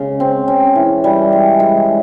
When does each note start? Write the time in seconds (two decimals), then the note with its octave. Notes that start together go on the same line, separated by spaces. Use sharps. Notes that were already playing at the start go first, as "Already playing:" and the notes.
Already playing: C#3 G#3
0.20 C4
0.48 C#4
0.75 E3
1.04 G3
1.32 G#3
1.60 G#3